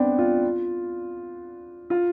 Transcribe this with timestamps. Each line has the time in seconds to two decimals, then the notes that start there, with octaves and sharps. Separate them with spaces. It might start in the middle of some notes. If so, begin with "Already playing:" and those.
Already playing: B3 C4 D4
0.18 F4
1.90 F4